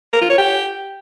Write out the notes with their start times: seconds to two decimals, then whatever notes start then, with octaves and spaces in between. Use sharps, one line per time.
0.13 A#4
0.21 F4
0.30 C#5
0.38 G4